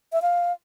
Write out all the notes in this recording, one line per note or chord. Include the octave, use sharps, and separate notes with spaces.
E5
F5